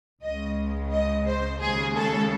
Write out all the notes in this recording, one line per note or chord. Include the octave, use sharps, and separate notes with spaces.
C#2 C#3 G#3 D#5
D#5
C5
D#2 C#3 G#3 G#4
A4